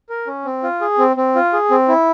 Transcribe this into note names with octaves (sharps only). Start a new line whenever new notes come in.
A#4
C#4
C4
F4
G#4
C4
C4
F4
G#4
C4
E4